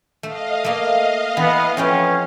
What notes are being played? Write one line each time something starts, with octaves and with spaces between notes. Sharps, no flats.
A3 D#5 F5
A3 A#3
E3 B3
F2 B3 C#4 G5